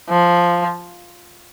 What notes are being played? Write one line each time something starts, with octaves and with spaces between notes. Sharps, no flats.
F3